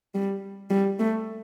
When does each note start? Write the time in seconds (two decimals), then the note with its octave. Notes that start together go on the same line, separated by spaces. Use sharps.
0.14 G3
0.70 G3
0.99 A3